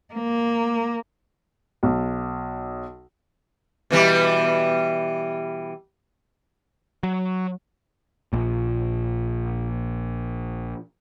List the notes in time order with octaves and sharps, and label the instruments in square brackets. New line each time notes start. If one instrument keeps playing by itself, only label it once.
[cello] A#3
[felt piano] B1
[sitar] B2 E3 G3
[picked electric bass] F#3
A#1 A#2